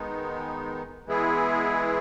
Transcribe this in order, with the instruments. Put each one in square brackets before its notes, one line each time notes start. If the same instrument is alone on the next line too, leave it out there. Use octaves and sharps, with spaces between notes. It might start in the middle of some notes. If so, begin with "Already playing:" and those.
Already playing: [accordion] D#3 G#3 B3 D#4
E3 G#3 B3 E4 G#4